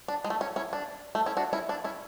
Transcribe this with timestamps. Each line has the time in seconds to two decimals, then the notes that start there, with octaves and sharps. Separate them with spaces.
0.08 D4
0.24 G#3
0.30 A3
0.41 C#4
0.56 C#4 E4
0.73 D4
1.15 A3
1.26 C#4 E4
1.37 D4 F#4
1.53 C#4 E4
1.69 D4
1.84 C#4 E4